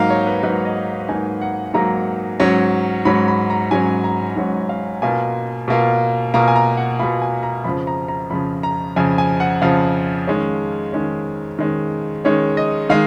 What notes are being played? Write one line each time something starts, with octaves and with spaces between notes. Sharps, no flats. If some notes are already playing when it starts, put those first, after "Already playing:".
Already playing: G#2 F#3 A#3 D#4 F5
C#5
B4
G#2 F#3 A#3 D#4 B4
D#5
G#2 F#3 A#3 D#4 G#5
F#5
G#2 F#3 A#3 D#4 A#5
G#2 F#3 C#4
G#2 F#3 C#4 B5
B5
A#5
G#2 F#3 C#4 G#5
A#5
G#2 F#3 C#4 F#5
F5
B2 A#3 F4 G#5
B2 A#3 F4
B2 A#3 F4 A#5
G#5
A#5
F#5
B2 A#3 F4 B5
G#5
A#5
F2 C#3 F3 B5
A#5
A#5
F2 C#3 F3 B5
A#5
F2 C#3 F3 G#5
G#5
F#5
F2 C#3 F3 F5
D#3 G#3 C#4
D#3 G#3 C#4
D#3 G#3 C#4
D#3 G#3 C#4 C#5
D#5
D#3 G#3 F5